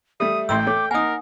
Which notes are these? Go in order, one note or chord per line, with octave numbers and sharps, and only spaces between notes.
G3 A3 E5 D#6
A1 A2 G5 C6 E6
A3 C#5 D6
A#3 D#4 A#4 F#5 G#5 D#6